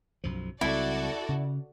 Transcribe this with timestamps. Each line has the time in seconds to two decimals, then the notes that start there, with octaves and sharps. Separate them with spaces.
0.24 B1 F#2 F3
0.61 C#2 G3 C4 E4 F#4 A4 D5
1.29 C#3